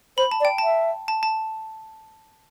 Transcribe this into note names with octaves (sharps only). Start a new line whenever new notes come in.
C5 B5
A5
D5
G5
E5 A5
A5
A5